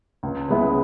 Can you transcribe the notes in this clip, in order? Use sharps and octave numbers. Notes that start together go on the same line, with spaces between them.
C#2
C#3 G#3 B3 E4